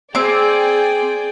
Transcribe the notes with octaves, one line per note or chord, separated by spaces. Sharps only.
C4 G#4 D5 G5 D6